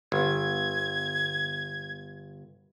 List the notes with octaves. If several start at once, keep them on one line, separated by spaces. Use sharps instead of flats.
G1 G#6